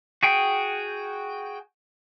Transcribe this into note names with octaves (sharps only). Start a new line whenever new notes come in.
F#4 G#4 G5